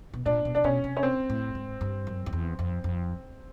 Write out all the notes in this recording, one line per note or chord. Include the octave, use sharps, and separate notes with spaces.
B2
A#2 D4
B2
C3 D4
B2 C#4
C3
C#4
C4
A2
G#2
G2
F#2
F2
E2
F2
F2